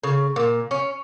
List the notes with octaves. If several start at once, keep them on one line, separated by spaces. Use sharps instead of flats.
C#3
A#2
C#4